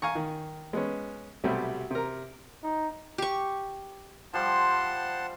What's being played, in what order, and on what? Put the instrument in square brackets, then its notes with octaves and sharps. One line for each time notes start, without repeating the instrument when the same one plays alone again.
[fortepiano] F5 G#5 A#5 C#6
D#3
G#3 B3 C#4
B1 C3 G3 A3
C3 A#4
[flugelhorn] D#4
[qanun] G4 C#6
[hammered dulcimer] F3 G3 C5 [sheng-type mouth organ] F#5 A5 C6